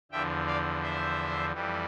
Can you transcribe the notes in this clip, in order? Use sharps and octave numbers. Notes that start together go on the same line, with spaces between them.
E2 D3 F3 E5 G5
D5 F5
C5 E5
F2 E3 G3